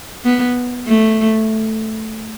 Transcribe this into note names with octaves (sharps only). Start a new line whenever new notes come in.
B3
A3